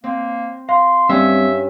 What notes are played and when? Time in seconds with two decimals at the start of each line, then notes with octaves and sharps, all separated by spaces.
0.04 A#3 C4
0.69 F5 C6
1.09 G2 G3 C4 C#4 E5 E6